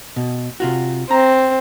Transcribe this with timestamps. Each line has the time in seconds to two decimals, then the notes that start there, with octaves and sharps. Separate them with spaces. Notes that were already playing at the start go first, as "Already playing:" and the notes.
0.16 B2
0.60 C3 F4 F#4
1.11 C4 A#5